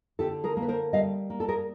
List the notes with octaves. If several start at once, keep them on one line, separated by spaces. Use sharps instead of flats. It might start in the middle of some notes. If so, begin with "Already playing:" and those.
D3 G4 A4
G#4 A#4
A#3
B4
A#4 C5
G3 D#5 F5
A#3
A4
G#4 A#4